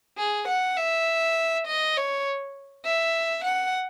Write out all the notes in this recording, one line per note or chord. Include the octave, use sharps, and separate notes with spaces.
G#4
F#5
E5
D#5
C#5
E5
F#5